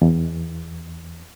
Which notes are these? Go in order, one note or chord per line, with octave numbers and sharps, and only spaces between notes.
E2